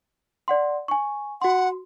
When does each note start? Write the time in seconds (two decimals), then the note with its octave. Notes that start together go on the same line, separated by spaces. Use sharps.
0.48 D5 F#5 C6
0.88 G#5 C#6
1.42 F#4 F#5 C6